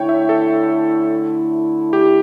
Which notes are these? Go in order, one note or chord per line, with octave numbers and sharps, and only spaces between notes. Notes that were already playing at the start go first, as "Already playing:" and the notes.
Already playing: D3 A3 E4 C#5 G5
E5
A4
G4